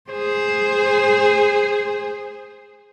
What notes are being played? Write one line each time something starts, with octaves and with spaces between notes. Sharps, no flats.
G#4 C5